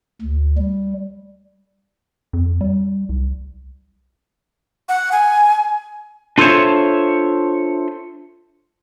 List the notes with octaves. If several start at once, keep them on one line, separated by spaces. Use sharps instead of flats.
D2
G3
F2
G3
C2
F#5
G#5
D4 F4 A4 C5 C#5 E5